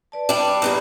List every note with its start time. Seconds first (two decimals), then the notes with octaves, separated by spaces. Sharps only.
0.12 B4 D5 A5
0.29 G3 D4
0.49 D5
0.62 E2 G2 A#2 A#5 B5